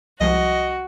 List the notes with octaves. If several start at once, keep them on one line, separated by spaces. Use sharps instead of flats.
C2 F3 G#3 F#4 D#5